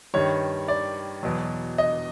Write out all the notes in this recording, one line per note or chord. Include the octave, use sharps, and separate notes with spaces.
G2 D#3 G3 C#5
D5
E2 B2 F#3
D#5